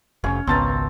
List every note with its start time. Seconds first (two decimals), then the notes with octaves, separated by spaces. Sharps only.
0.24 F1 C#4
0.47 G#1 C#2 B3 C4 C#5 A5 A#5 A6